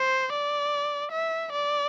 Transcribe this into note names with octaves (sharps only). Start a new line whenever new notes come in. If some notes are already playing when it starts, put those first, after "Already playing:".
Already playing: C5
D5
E5
D5